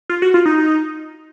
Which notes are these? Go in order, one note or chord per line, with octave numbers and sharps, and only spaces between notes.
F4
F#4
F4
D#4